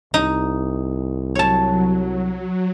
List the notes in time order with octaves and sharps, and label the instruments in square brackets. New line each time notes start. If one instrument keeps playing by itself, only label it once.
[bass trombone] C2 [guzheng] D#4
[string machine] F#3 [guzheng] C#5 A5